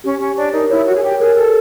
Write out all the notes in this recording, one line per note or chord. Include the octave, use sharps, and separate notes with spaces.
C#4 G4
C#4 G4
D4 C#5
D#4 A#4
E4 C#5
F#4 C#5
G#4
G4 C#5
G#4 A#4
G4 A4